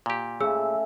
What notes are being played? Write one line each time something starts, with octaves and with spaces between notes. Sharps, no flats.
A#2 G4
C#3 A3 G#4 E6